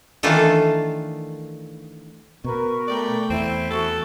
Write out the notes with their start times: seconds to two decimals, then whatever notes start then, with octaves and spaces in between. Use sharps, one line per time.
0.23 D#3 E3 A3 D4 F4 A4
2.44 B2 A#4 B4 C#6
2.88 A3 D5 G5
3.30 E2 C4 E4
3.71 F#4 A4 C#6